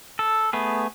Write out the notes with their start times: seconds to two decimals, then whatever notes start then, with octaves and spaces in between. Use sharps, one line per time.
0.19 A4
0.53 A3 B3 G#4